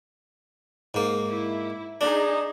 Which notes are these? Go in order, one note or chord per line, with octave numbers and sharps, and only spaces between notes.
G#2 A#3
E4
D4 D#4 G#4